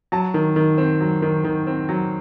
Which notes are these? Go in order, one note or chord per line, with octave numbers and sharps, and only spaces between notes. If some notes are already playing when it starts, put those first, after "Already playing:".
F#3 A5
D#3
D#3
C4
F#3
D#3
D#3
C4
F#3